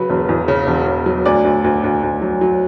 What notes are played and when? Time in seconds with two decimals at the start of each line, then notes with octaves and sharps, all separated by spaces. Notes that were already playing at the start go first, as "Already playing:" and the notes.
Already playing: C#3 F#3 B4
0.09 E1
0.29 E2
0.48 C#3
0.67 E1
0.87 C#3
1.06 F#3
1.26 D2 D5
1.44 D2
1.64 D2
1.84 D2
2.03 D2
2.22 F#3
2.41 F#3